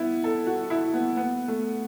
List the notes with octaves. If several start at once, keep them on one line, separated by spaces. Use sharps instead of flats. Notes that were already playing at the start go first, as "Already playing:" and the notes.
Already playing: B3 E4
A4
F#4
E4
B3
B3
A3